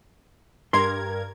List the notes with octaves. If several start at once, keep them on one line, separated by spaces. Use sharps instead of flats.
G2 A#4 C6 G#6